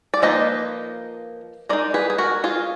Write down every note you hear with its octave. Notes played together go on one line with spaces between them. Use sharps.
D5
F3 A#3 D#4 B4 D#5
G#3 D#4 A#4 D5
G#4 B4
G#4
F#4 A#4
F4 G#4